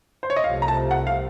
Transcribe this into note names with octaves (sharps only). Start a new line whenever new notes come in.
C5
C#5
D#5
C2 C3 F3 A3 F5
A#5
A5
F#5
F5